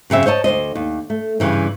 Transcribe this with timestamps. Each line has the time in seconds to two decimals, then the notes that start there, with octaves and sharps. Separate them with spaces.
0.10 F#2 C#3 C4 E5
0.26 C5 C#5 D#5 A5
0.44 D2 A#2 C5 D#5
0.75 D#2
1.10 A3
1.40 G2 C#3 E3 G3